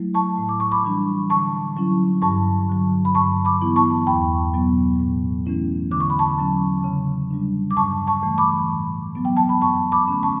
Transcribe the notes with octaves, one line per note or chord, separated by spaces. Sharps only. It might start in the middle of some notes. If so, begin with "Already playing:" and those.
Already playing: F#3 A3 E4
A5 C#6
A2
D6
C#6
B5 D6
E3 G3 D4
D3 A5 C#6
F#3 C#4 E4
G2 A5 C#6
D3 F#3
B5
G2 A5 C#6
B5 D6
E3 B3 E4
A5 C#6
E2 G5 B5
B2 F#3 B3
A2
E3 A3 C#4 E4
D3 D6
C#6
B5
A5 C#6
F#3 C#4
C#3
G3 D4
D6
G2 A5 C#6
A5 C#6
E3 A3
B5 D6
A2
F#3 B3
G5
A5
B5
F#2 A5 C#6
B5 D6
D3 A3 C#4
A5 C#6